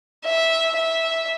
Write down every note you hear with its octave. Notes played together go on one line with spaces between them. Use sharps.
E5
E5